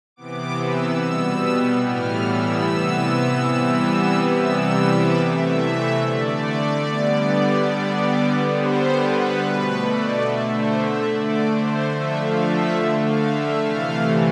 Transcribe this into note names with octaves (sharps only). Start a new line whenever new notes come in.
C3 E3 B3 D6
E6
B2 G3 B3 E6
E6
A2 E3 G3 B3 F6
E6
C3 E3 B3
C3 E3 G3 B3
C3 E3 G3 B3 E6
E6
D6
C3 E3 A3 E5
D3 A3 D5
D3 G3 B3
D3 G3 B3
D3 G3 B3 C5
B4
B2 A3 B4
D5
D3 A3 E5
C5
E5
D3 A3 D5
C5
D3 F3 A3 E5
F5
E5
D3 A3
F5
E5
C3 E3 A3 F5